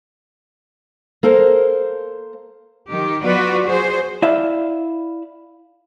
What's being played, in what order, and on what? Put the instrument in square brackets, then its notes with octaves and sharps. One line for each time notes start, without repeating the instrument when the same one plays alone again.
[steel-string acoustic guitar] A#3 A4 A#4 C5
[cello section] D#3 G4
F#3 B3 F4 F#4 B4 D5
F#4 G#4 C5
[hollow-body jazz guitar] E4 D5 E5 F5